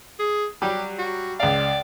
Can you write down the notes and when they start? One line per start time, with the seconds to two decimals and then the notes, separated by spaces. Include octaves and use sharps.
0.19 G#4
0.62 F#3 G3 G4
0.99 F#4
1.40 C#2 D5 F5